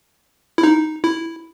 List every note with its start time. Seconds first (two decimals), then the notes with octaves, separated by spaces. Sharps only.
0.58 E4
0.63 D#4
1.04 E4